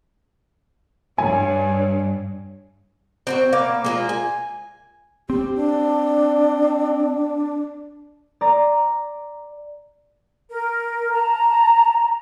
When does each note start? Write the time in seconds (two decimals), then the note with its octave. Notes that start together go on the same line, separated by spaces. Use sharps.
1.18 G2 C#5 G#5
3.27 C4 E4 F#4
3.53 A#3 B3 F5
3.84 G#3 A#3 F4
4.09 G#5
5.30 C4 G4
5.56 D4
8.41 D5 A#5
10.49 A#4
11.13 A5 A#5